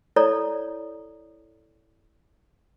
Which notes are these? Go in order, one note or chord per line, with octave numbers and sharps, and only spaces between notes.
E4 A4 C#5 D5 A#5